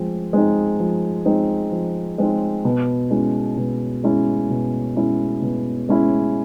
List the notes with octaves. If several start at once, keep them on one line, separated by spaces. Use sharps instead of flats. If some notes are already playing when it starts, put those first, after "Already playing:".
Already playing: F3 G#3 C4
G#3 C4 D#4
F3
G#3 C4 D#4
F3
G#3 C4 D#4
B2
G#3 C#4 E4
B2
G#3 C#4 E4
B2
G#3 C#4 E4
B2
G#3 C#4 E4